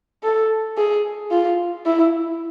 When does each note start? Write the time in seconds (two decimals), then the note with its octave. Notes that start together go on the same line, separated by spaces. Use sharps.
0.24 A4
0.77 G#4
1.31 F4
1.86 E4